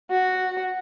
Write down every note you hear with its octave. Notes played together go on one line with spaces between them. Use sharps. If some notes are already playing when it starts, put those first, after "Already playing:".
F#4